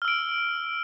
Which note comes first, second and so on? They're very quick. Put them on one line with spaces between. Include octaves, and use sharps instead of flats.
F6 E6 D7